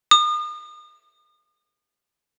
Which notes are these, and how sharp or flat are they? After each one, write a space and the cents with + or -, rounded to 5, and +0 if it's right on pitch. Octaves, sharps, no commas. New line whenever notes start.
D#6 -40